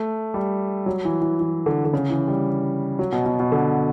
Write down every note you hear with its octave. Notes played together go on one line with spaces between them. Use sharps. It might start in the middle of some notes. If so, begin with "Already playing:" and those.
Already playing: A3
G3
F#3
E3
E3
E3
D3
D3
C#3
E3
G3
F#3
B2
B2
B2
D3